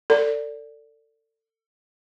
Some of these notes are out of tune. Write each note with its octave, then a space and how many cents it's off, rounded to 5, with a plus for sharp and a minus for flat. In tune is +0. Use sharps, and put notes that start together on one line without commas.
A4 +35 D5 -10